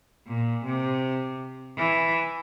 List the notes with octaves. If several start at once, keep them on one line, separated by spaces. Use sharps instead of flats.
A#2
C3
E3